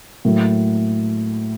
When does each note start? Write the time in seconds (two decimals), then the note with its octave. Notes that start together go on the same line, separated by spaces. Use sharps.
0.25 A2 F#3 A#3